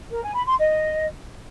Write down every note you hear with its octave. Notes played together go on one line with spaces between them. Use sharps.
A#4
G#5
B5
C6
D#5